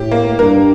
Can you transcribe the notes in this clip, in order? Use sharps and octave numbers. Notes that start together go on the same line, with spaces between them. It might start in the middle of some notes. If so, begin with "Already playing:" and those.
Already playing: A2 G4
A#3
G2 A#4